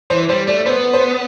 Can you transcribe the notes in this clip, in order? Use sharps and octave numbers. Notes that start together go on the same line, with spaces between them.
E3 C5
G3 C5
A3 D5
B3 C5
C5